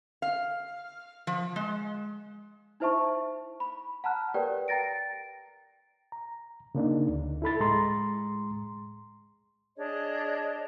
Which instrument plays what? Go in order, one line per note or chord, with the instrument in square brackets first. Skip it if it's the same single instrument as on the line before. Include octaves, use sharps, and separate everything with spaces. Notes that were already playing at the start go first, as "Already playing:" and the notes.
[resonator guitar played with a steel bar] F5
F3
G#3
[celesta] D#4 E4 C5 E5 A5 C#6
B5
F#5 A5 A#5 F6 F#6
G4 A#4 B4 C#5 D5 G5
G5 A#5 A6 A#6 D7
[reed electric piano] A#5
C#3 A#3 D4 D#4
D2
E4 A4 B5 A6
A2 G#3 A#5 C6
[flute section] D4 G#4 C#5 D#5